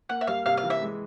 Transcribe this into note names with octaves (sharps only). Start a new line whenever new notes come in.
A#3 F#5
E5
G3 F5
C3 F5
F5
E3
E5
G#3